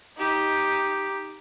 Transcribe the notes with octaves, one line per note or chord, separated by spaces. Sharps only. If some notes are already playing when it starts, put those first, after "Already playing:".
D#4 G4